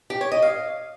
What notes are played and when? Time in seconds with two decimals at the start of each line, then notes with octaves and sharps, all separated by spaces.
0.10 G4
0.21 C#5
0.32 D#5
0.42 F5